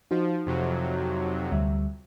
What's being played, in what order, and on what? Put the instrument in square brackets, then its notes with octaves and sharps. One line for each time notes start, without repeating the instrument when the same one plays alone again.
[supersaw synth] F3 [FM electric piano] D#4 F#4 C5
[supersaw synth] F2 C3 F#3
[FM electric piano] D2 G3 E5